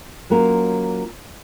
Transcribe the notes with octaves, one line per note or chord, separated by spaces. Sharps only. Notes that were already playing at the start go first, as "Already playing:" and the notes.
F#3 A#3 C#4 F4 A#4